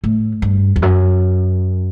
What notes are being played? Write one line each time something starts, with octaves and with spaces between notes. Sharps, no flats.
A2
G2
E2
F#2